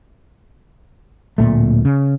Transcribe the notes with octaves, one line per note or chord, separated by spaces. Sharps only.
D1 A#2 A3
C#3